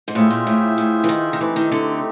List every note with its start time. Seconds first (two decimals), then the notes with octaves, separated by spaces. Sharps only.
0.08 G#2
0.15 A2 F4 G#4 C5 E5 G5
0.30 A#2
0.47 A2
0.78 A2
1.04 E3
1.09 D#3
1.33 D#3
1.40 E3 A3 C4 D#4 G4
1.56 D#3
1.72 D3